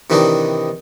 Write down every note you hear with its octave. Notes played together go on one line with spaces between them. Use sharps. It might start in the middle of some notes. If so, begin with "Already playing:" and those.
C3 D#3 E3 D4 D#4